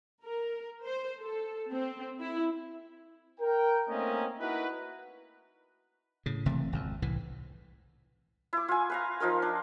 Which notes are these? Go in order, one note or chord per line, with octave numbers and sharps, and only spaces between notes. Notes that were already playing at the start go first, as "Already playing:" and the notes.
A#4
C5
A4
C4
E4
A#4 G5
A3 A#3 C4 C#4 D#4 D#5
D#4 E4 F#4 A#4 B4
A2 C#3
F#1 C3 E3 A3
G#1 F2
C2 A2 E3
E4 D6
F4 G#5
B4 F5 A#5
F3 D#4 F4 A#4
D4